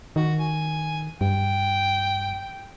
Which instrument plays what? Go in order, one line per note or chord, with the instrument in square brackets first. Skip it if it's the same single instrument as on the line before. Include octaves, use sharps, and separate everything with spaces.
[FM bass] D#3 [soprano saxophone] F#4
[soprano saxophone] G#5
[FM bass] G2 [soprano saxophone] G5